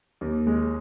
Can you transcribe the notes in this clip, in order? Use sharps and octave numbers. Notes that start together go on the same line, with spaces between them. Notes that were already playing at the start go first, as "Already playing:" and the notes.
D#2
G#3